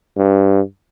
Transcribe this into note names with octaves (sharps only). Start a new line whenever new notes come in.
G2